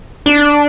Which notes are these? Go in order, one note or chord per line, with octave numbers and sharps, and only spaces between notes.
D4